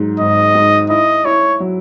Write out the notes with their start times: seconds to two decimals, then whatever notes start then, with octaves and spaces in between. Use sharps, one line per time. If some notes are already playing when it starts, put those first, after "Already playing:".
Already playing: G#2 F#3
0.20 G#1 D#5
0.55 G#2
0.90 E4 D#5
1.25 E4 C#5
1.60 F#3